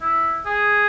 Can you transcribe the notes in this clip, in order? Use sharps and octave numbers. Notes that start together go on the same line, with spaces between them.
E4
G#4